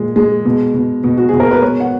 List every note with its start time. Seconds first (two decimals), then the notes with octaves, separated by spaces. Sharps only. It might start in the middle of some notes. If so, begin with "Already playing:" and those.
Already playing: A#2 G#3
0.16 G#3
0.45 B2
0.74 B2
1.04 B2
1.18 F#4
1.29 B2 G#4
1.40 A#4
1.51 B4
1.62 G#3 C#5
1.80 F#5